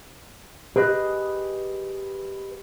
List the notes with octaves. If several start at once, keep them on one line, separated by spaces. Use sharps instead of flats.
G4 G#4 B4 D#5